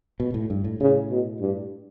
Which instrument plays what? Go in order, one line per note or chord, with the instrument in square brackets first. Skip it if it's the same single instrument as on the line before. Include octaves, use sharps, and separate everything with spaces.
[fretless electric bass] B2
A2
G2
A2
[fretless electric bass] A2 [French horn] C#3
[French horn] B2
G2